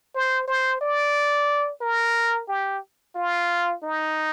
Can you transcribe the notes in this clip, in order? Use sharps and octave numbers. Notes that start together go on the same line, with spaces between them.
C5
C5
D5
A#4
G4
F4
D#4